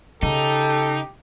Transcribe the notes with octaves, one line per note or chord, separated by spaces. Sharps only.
C#3 D#4 G4 A4